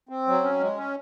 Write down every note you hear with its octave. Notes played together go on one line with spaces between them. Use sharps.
C4
F#3
C#4
G#3
C#4